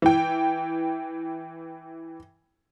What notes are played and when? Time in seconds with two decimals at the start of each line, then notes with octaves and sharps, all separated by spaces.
0.02 E3 G5